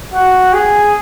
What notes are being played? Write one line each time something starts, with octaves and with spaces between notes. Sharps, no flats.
F#4
G#4